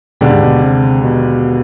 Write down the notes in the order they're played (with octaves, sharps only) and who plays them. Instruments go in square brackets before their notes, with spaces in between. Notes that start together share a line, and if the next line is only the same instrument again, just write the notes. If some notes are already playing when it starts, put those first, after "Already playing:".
[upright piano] D#2 D3 G#3 D4 G4 [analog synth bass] B2
[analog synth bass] G#2
B2
C3
B2